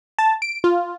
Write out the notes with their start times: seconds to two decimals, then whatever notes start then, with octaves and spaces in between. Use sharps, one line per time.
0.19 A5
0.42 D7
0.64 F4